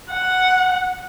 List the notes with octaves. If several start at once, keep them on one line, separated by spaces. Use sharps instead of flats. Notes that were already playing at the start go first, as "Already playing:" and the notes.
F#5